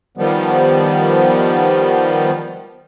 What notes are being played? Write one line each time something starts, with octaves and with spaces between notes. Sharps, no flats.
D#3 F3 G3 B3